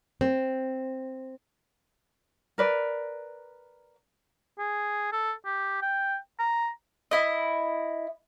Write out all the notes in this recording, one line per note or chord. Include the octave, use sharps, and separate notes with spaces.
C4
A#4 B4 D5
G#4
A4
G4
G5
A#5
E4 D#5